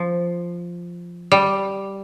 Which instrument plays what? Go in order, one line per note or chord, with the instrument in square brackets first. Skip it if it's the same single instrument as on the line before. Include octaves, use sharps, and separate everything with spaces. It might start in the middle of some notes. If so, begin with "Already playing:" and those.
Already playing: [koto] F3
G3